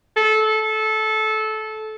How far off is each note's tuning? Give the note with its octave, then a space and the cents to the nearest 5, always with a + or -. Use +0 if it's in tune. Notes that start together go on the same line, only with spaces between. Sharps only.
A4 -20